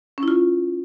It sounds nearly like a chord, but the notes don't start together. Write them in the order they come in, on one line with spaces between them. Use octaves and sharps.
C#4 E4 F4